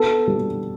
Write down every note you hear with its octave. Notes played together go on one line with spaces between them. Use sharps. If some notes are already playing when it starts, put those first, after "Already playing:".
Already playing: B3 A4
G3